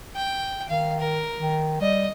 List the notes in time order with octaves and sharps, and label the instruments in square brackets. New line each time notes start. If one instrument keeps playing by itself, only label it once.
[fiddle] G5
[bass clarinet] D#3 [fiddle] F5
[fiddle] A#4
[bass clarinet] D#3
[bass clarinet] G3 [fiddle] D#5